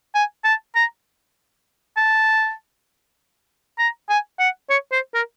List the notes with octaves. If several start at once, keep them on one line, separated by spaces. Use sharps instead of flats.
G#5
A5
A#5
A5
A#5
G#5
F#5
C#5
C5
A#4